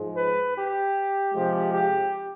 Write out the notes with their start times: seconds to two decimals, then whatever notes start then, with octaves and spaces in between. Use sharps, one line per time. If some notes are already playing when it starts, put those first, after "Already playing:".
Already playing: G#2 F3 G#3
0.17 B4
0.56 G4
1.33 C3 F3 G#3
1.72 G4